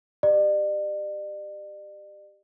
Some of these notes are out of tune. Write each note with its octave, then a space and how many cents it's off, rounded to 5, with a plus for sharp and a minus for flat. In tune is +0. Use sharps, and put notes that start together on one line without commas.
G4 +0 D5 +40